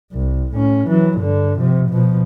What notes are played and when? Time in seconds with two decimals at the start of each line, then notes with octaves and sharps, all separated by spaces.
0.12 C2
0.53 A2 C#4
0.87 E3 F#3
1.18 G2 D3
1.58 C3 F3
1.89 B2 F3